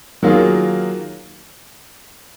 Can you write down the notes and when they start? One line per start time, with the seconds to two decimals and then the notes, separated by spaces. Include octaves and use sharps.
0.23 D#3 F#3 A#3 F4 G#4